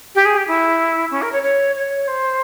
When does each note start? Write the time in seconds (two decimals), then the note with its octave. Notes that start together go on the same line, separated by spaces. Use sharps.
0.15 G4
0.25 G#4
0.37 G4
0.47 E4
1.11 C#4
1.22 A#4
1.32 C#5
1.43 C#5
1.76 C#5
2.08 C5